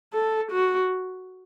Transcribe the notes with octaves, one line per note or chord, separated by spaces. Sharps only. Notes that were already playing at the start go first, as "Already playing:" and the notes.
A4
F#4